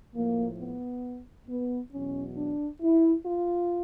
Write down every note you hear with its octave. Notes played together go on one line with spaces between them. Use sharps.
A2 F3 A#3
B3
B3
E2 B2 F#3 C#4
D4
E4
F4